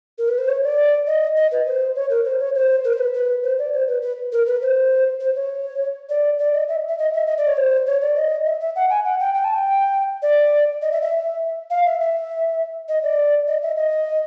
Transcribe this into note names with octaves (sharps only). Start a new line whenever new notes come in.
A#4
B4
C5
C#5
D5
D#5
D#5
B4
C5
C#5
A#4
C5
C#5
C5
A#4
C5
B4
B4
C5
D5
C5
B4
B4
A#4
B4
C5
C5
C#5
D5
D5
D#5
E5
E5
D#5
E5
D#5
D5
C#5
C5
C#5
D5
D#5
E5
E5
F#5
G#5
F#5
G5
G5
A5
G5
D5
D#5
E5
E5
F5
E5
E5
D#5
D5
D#5
E5
D#5